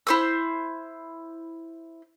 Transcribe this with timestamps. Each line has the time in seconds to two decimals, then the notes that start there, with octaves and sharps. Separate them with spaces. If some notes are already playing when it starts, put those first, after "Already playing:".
0.07 E4 C5 E6